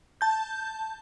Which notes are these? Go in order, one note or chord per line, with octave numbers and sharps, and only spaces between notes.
A5 G6